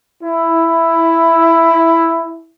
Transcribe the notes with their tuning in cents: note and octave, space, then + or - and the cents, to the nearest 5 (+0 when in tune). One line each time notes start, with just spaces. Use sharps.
E4 +5